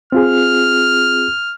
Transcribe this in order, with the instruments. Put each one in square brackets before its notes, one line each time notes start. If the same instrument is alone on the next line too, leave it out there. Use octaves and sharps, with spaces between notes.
[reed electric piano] C4 F4 G#4 [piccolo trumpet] F6